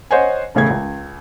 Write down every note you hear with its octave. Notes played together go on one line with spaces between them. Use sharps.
C5 C#5 D#5 F#5 G#5
E1 A2 C#3 A3 G#6
C#2